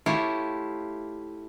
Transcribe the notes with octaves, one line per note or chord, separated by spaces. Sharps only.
A3 E4 F4 G4 C#5